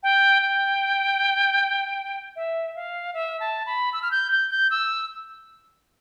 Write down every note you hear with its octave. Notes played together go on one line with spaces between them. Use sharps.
G5
G5
E5
F5
E5
A5
B5
E6
F6
G6
G6
G6
E6